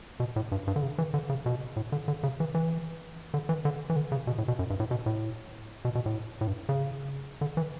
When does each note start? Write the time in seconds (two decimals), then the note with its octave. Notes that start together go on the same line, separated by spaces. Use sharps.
0.20 B2
0.36 A2
0.52 G2
0.67 G2
0.76 D3
0.82 C#3
0.98 E3
1.14 D3
1.29 C#3
1.46 B2
1.76 A2
1.92 D3
2.08 D3
2.23 C#3
2.40 E3
2.55 E3
3.34 D3
3.49 E3
3.65 D3
3.90 E3
3.96 D3
4.12 C#3
4.27 B2
4.38 A2
4.48 B2
4.59 F#2
4.70 G2
4.80 A2
4.91 B2
5.06 A2
5.85 B2
5.95 B2
6.06 A2
6.41 A2
6.47 G2
6.69 C#3
7.41 D3
7.57 E3